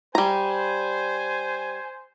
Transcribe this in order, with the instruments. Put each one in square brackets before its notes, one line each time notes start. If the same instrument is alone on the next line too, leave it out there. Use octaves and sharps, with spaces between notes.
[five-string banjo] G3 A#5 [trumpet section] C5 G#5